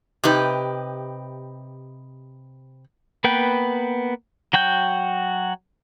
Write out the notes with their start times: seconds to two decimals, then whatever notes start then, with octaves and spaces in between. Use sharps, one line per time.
0.24 C3 D#4 G4 B4
3.24 A#3 B3 B4 G5
4.53 F#3 F#4 G5 G6